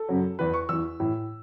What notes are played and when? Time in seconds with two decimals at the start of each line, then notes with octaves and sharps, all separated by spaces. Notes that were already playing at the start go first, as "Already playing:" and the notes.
Already playing: A4
0.09 F#2 C#3 F#3
0.39 E2 E3 B4
0.54 C#6
0.69 E2 E3 E6
1.00 A2 E3